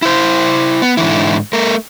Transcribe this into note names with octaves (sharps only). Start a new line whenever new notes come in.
E4 C5
B3
G#2 D3 E3 E4
A3 A#4